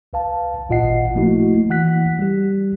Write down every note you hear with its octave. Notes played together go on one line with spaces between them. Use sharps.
C2 B4 F5 A5
G#1 A#2 F4 D#5 F#5 C7
F3 A3 A#3 E4 F#4
E3 F#5 F#6 B6
G3 G4